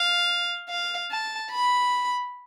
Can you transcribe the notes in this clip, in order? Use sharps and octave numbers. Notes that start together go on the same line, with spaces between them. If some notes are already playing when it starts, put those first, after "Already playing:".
Already playing: F5
F5
A5
B5